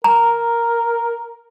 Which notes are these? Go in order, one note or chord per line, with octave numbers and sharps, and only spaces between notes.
A#4 A#5